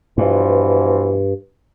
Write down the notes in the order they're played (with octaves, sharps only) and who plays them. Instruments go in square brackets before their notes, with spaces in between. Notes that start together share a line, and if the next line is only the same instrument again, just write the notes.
[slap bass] G2 [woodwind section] B2 E3 F3